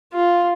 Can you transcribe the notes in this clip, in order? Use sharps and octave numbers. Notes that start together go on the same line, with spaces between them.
F4